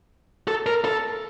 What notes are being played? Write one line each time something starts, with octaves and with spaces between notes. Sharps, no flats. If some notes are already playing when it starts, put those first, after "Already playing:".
A4
A#4
A4